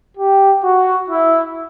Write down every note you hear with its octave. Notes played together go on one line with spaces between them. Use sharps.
G4
F#4
E4